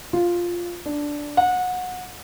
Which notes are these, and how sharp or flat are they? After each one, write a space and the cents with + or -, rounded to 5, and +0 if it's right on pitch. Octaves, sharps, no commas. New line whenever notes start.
F4 +0
D4 -5
F#5 -25